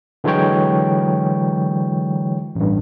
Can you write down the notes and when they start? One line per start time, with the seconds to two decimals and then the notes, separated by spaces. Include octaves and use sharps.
0.24 D3 E3 F#3 G#3 C#5 G5
2.55 A1 G2